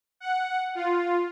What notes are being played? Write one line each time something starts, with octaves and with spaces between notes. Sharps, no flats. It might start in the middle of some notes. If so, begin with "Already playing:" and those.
F#5
F4